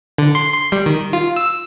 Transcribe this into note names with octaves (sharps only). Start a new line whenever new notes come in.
D3
C6
C6
G3
D#3
F4
E6